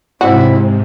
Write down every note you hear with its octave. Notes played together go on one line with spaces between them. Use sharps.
G#2 C3 C4 E4 F#4